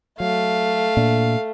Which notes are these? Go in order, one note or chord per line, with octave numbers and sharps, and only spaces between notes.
F#3 A3 F5
A#2 D4